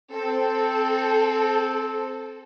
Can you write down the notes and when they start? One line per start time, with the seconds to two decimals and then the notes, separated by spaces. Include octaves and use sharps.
0.12 C4 A4